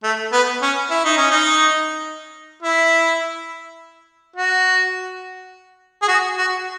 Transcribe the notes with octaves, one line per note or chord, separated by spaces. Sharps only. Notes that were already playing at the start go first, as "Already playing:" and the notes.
A3
B3
C#4
E4
D#4
C#4
D#4
E4
F#4
G#4
F#4
F#4